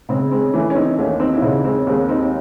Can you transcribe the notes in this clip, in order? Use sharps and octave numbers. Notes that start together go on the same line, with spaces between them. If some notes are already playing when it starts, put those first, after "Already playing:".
C#3 G#3 C4
G#3 C4
E3 A3 C#4
C#4
C4 D#4
D#2 A3 C#4
C4 D#4
E4
C#3 C4 D#4
G#3 C4
D#2 G#3 C4
C4 D#4